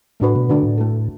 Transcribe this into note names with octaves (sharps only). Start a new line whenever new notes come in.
A2 A3 D4 F#4 B4
B2
D3 A3 D4 F#4 B4
A2
A3 E4 A4